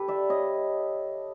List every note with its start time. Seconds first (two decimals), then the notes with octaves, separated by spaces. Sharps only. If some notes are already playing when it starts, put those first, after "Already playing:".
Already playing: G4 A4 B4
0.08 D5 E5
0.30 C#5 D#5